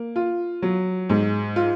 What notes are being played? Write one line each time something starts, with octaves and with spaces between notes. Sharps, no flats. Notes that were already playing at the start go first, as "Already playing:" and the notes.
Already playing: A#3
F4
F#3
G#2
F4